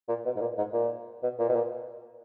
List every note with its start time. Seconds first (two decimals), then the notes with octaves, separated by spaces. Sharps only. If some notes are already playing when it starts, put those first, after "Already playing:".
0.08 A#2
0.26 B2
0.36 G#2
0.41 A#2
0.58 G#2
0.73 A#2
1.23 B2
1.39 A#2
1.49 B2
1.55 A#2